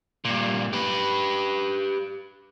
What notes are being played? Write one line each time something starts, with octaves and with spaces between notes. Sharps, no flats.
G2 A#2
G4 B4